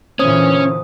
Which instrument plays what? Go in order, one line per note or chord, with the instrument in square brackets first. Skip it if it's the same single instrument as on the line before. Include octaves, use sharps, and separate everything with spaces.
[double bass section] A#2 D3 E3 [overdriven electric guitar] C#4 [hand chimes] C5 D#6